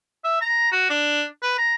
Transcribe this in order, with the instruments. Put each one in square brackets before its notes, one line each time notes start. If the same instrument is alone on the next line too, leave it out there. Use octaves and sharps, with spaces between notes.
[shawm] E5
A#5
F#4
D4
B4
A#5